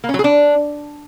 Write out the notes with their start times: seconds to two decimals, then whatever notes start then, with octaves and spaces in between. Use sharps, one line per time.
0.04 A#3
0.09 C#4
0.14 F#3
0.19 G#4
0.24 D4